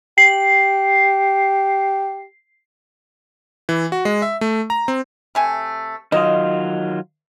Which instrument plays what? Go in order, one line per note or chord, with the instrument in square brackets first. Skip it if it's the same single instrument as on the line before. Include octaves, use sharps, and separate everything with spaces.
[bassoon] G4 [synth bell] C7
[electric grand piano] E3
F#4
G#3
E5
A3
A#5
C4
[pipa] C3 A3 G#5
[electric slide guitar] D#3 F#3 F4 [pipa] D#5